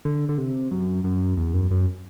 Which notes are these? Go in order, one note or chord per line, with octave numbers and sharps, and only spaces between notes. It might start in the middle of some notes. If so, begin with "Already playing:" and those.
D3
D3
C3
F#2
F#2
E2
F#2
F#2